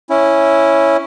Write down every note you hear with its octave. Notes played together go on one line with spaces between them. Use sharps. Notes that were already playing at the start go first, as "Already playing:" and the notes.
C#4 E4